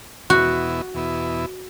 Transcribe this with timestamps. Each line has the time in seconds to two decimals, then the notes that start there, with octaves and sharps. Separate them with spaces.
0.30 E2 B2 B3 E4 F#4
0.94 E2 B2 B3 E4